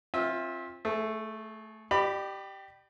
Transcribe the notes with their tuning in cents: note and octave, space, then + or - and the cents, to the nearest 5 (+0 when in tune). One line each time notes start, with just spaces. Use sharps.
C4 +30 F4 +0 E5 -20
A3 +0 G#4 +30
G4 -10 D5 +40 B5 +0